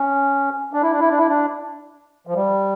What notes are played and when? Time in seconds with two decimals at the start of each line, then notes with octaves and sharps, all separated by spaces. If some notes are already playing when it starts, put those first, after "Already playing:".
Already playing: C#4
0.73 D4
0.83 E4
0.91 D4
1.00 E4
1.10 D4
1.18 E4
1.27 D4
2.27 F3
2.35 G3